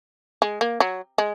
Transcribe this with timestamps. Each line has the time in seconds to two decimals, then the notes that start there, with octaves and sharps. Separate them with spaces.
0.42 G#3
0.61 A#3
0.80 F#3
1.18 G#3